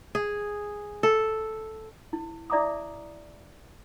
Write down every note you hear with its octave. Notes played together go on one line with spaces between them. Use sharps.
G#4
A4
E4
E4 D5 E5 A#5 D6 D#6